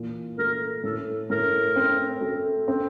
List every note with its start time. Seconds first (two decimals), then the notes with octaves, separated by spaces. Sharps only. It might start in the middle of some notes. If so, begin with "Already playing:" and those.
Already playing: A#2 E3
0.38 A3 A#4
0.83 A2 A4
1.30 A2 A#4
1.76 C4
2.21 A3
2.68 C4